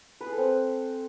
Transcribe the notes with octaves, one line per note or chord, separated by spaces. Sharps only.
B4
G#4
A4
C4